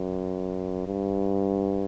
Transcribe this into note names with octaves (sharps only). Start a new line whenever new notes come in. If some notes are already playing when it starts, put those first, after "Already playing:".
Already playing: F#2
G2